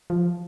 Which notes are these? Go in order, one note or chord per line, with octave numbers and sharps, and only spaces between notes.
F3